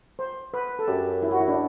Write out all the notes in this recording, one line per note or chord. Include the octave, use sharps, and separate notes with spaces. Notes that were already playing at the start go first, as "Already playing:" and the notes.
C5
B4
A4
F#2 G4
E4
F#4
E4
D4